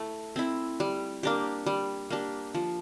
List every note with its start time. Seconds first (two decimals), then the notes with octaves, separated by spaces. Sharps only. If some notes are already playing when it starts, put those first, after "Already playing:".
Already playing: A3 E4
0.36 C4 E4
0.80 G3
1.23 A#3 D4 G4
1.66 G3
2.10 A#3 D4 G4
2.55 F3